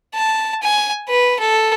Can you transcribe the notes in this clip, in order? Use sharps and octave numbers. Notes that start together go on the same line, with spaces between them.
A5
G#5
B4
A4